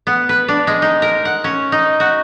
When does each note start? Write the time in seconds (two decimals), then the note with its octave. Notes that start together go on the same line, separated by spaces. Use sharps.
0.07 B3
0.29 B4
0.48 D4
0.67 G#3
0.82 D#4
1.02 A#4
1.25 F#5
1.44 C#4
1.72 D#4
2.00 F#4